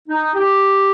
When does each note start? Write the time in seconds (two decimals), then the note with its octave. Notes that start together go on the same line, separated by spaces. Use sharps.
0.09 D#4
0.34 G4